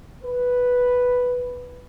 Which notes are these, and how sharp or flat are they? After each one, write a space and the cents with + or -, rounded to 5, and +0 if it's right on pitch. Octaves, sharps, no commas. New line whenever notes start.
B4 +0